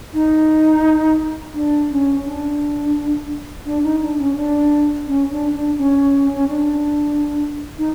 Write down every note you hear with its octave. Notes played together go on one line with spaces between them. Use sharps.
D#4
D4
C#4
D4
D4
D#4
D4
C#4
D4
C#4
D4
D4
C#4
C#4
D4
D#4